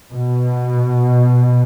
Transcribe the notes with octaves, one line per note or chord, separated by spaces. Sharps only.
B2